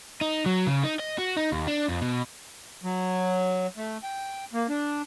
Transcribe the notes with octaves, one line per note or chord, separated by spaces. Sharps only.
D#4
F#3
C#3
D#4
D#5
F#4
D#4
D#2
D4
F2
B2
F#3
A3
G5
A#3
D4